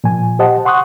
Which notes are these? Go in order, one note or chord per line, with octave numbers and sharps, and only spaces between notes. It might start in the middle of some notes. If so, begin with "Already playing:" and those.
A#2 F3 G#5
G4 C5 D#5 F#5 A5
F#5 C6 C#6 D#6 F#6